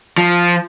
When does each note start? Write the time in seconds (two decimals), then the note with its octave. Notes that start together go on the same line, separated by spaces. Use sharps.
0.18 F3